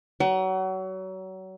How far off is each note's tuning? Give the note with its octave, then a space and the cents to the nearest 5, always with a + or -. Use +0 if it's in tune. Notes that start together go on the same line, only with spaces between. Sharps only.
F#3 +30 F#5 +35